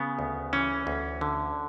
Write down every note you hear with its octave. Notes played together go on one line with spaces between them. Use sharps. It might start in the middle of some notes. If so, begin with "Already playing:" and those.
Already playing: C#3 B3
D2
E3 C#4
D2
D3